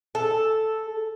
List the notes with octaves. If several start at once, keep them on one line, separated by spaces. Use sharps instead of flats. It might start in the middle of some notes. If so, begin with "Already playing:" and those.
A4